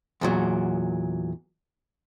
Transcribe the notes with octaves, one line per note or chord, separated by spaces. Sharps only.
E2 A#2 F#3